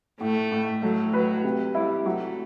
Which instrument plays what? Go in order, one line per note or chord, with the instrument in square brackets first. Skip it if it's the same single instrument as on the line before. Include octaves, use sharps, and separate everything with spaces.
[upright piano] A2 [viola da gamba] A3
[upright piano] A2
[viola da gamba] F#3 [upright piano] A3
[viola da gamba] F#3 [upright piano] B4
[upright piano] C3
[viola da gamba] G3 [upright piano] E4
[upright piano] F#3 [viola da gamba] A3